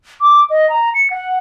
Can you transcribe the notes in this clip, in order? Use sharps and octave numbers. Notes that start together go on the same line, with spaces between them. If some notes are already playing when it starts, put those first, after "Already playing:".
D6
D#5
A#5
C#7
F#5